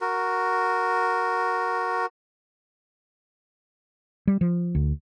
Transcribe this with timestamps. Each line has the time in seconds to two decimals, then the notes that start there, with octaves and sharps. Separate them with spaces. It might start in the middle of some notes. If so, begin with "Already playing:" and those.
0.01 F#4 A#4
4.27 G3
4.41 F3
4.75 D2